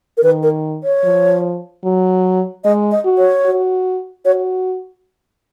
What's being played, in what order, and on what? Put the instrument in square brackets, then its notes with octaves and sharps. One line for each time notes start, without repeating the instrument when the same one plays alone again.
[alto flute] A#4
[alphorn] D#3 [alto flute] B4
[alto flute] A#4
C#5
[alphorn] F3
F#3
[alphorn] G#3 [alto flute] D#5
[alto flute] D#5
[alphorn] F#4
[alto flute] C#5
[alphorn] F#4
[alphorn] F#4 [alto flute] C#5